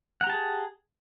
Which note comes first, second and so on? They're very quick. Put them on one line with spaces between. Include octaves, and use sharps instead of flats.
F#5 A#5 G4 A5 G#4